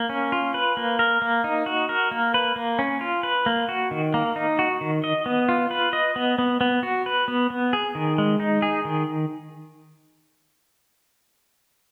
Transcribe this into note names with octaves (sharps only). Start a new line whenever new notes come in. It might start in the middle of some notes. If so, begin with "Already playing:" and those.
Already playing: A#3
C#4
F4
B4
A#3
A#4
A#3
D#4
F#4
A#4
A#3
B4
A#3
C#4
F4
B4
A#3
F#4
D#3
A#3
D#4
F#4
D#3
D#5
B3
F4
B4
D#5
B3
B3
B3
F#4
B4
B3
B3
G#4
D#3
G#3
D#4
G#4
D#3